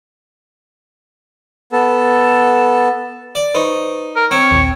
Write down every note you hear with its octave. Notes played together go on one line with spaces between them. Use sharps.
B3 A4
D5
D#4 B4 C5 C#6
A#4
C4 C#5
A#1 D#2